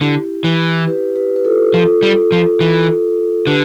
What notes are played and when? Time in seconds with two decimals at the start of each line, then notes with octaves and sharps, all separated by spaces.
0.01 D3 E4 G4
0.44 E3
0.87 G4 B4
1.16 G4 B4
1.36 B4
1.45 F4 A4
1.74 F3 F4 A4
2.03 G3
2.32 F3
2.61 E3
3.47 D3 G4 B4